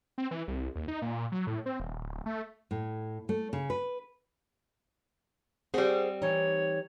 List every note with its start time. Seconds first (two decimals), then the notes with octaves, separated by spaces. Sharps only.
0.18 C4
0.31 E3
0.48 C2
0.76 D#2
0.88 D#4
1.02 A#2
1.32 F#3
1.47 A2
1.66 C4
1.80 D#1
2.00 D1
2.26 A3
2.71 A2
3.29 A3
3.53 C#3
3.70 B4
5.74 G3 C4 G#4 C5 F#5
6.22 E3 D#4 C#5